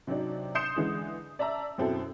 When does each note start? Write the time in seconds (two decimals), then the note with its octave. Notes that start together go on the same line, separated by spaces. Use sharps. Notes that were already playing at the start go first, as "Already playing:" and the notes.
0.07 C3 F#3 C4 D4 D#4
0.55 C6 D#6 G6 C7 C#7 E7
0.76 D3 E3 G#3
1.39 D5 E5 A5 A#5 E6
1.78 F#2 B2 C4 E4 A4